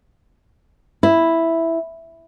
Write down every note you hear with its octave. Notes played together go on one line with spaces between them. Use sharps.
E4